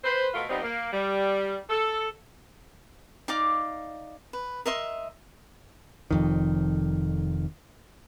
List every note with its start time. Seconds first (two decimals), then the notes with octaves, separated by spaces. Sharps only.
0.04 B4 C5
0.34 B2 A3 B3 F4 A4 A#4
0.49 F3 G3 B3 C4 D#4
0.62 A#3
0.92 G3
1.69 A4
3.28 D#4 D5 F5 D6
4.33 B4
4.66 A#4 D#5 E5 C6
6.11 F1 F2 D#3